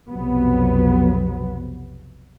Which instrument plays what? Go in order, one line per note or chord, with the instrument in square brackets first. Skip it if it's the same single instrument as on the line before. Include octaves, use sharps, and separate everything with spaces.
[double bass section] B1 F2 C3 F#3 B3